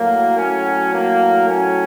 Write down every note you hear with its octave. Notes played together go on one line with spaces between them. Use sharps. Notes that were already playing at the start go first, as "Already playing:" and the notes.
Already playing: A2 F#3 A#3
C#4
A#3
C#4